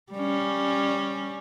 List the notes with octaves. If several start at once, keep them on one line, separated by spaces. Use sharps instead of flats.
G3 C#4